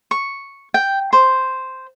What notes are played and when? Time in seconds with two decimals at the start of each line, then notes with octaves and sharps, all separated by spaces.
0.11 C#6
0.74 G5
1.13 C5